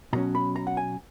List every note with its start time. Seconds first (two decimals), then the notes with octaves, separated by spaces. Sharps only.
0.13 B2 F#3 C#4 A#5
0.35 B5
0.56 A#5
0.67 F#5
0.77 G#5